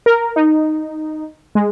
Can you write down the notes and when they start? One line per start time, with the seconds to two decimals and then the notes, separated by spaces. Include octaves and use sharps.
0.06 A#4
0.36 D#4
1.55 G#3